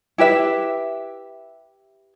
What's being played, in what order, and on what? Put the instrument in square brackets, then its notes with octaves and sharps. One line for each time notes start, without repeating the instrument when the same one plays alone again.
[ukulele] E4 G4 B4 E5